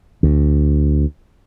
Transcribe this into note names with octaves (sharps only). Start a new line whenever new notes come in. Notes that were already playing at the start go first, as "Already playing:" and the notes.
D2